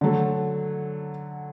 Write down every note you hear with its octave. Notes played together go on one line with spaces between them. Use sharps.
D3 F#3 A3